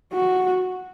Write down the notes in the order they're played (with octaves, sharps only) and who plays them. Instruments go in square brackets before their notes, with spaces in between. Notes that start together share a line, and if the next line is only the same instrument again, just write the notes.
[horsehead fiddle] F#4